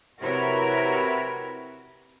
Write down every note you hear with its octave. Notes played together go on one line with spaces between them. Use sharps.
C3 E4 F#4 A#4 B4 C#5